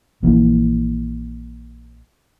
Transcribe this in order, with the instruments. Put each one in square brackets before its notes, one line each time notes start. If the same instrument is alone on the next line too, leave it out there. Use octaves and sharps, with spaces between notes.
[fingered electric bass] A#1 A#2 E3